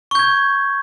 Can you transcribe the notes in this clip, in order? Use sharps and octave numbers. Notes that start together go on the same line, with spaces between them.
C#6 G6 G#6